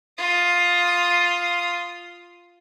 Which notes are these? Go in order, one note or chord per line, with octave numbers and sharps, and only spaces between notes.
F4 D#6